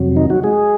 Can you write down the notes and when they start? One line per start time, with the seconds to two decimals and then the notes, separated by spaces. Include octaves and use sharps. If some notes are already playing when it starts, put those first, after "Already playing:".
Already playing: F2 C3 F#3
0.16 D#3 D#4
0.30 F#3 F#4
0.43 G#3 G#4